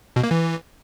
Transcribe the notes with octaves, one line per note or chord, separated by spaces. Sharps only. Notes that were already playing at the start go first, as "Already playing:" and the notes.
B2
A#3
E3